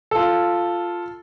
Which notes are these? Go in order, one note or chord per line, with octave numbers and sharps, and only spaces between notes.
F4 A4